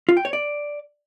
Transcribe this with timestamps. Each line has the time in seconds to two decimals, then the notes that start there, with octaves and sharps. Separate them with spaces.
0.09 F4
0.17 G5
0.25 C#5
0.33 D5